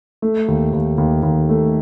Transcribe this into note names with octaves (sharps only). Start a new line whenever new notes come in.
A3
D#2
D#2
D#2
D#2
A3